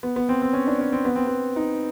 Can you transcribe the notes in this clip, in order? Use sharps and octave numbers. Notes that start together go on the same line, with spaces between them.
B3
B3
C4
C4
C#4
D4
C#4
C4
B3
C4
B3
D#4